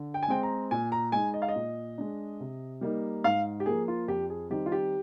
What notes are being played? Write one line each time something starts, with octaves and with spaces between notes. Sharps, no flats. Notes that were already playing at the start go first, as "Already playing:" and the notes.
Already playing: D3
G5
G#5
G#3 C4 G5
A#5
A#2 G#5
A#5
G#3 D#4 G#5
D#5
F5
D#5
A#2
G#3 D4
C3
G3 A#3 D#4
G#2 F5
G4
F3 A#3 G#4
F4
F2 G4
G#4
D#3 G3 C4 D#4 G4
F4
G4